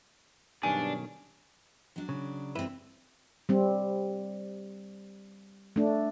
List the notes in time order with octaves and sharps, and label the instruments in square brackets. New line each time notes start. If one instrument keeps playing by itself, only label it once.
[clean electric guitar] B1 D#3 C#4 [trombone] G2 [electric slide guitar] D4 [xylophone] G#5
[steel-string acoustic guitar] F#3 D4
[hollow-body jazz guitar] C#3
[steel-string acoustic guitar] G2 C4 [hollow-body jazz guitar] E4 B4
[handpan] G3 C4
A3 D4